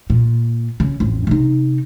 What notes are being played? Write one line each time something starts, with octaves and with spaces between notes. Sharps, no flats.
A#2
C#3
A1 F2
C3 D#4